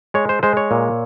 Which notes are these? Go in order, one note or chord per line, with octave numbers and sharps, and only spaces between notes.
G#3 C#5
C5
G#3 C5
C#5
A#2